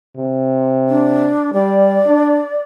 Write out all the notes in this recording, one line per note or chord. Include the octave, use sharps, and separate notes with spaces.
C3
D4
G3 D5
D4